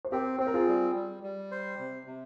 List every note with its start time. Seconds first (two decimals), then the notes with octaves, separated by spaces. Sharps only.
0.05 C5
0.12 C4 G4 A#4
0.39 C4 C5
0.47 A#4
0.54 F4 G#4
0.68 G3
0.95 G3
1.23 G3
1.51 C5
1.79 C3
2.07 C3